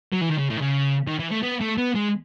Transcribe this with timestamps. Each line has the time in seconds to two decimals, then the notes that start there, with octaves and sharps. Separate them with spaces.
0.12 F#3
0.21 E3
0.30 D#3
0.38 C#3
0.50 A2
0.57 D#3
0.61 C#3
1.08 D#3
1.20 E3
1.31 A3
1.43 B3
1.61 A3
1.78 B3
1.95 G#3